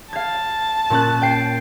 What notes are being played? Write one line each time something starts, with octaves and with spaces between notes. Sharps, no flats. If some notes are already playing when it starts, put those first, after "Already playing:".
F5 A5 G#6
A#2 C#4 F#6
G5 G6 C7